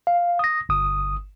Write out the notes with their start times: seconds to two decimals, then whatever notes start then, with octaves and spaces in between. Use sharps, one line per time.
0.07 F5
0.39 D#6 A#6
0.69 G1 D#6